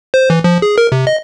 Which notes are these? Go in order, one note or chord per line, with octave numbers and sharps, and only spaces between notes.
C5
E3
F3
G#4
A#4
C3
D#5